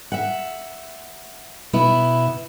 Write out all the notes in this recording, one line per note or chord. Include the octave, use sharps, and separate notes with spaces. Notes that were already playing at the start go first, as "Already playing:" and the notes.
E5 F#5
B2 B3 E4